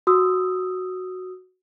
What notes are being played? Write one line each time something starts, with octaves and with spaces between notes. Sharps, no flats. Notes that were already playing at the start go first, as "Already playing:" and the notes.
F#4 D#6 E6